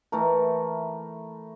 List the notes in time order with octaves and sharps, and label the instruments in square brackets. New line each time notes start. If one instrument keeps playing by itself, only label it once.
[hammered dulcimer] E3 A3 A#4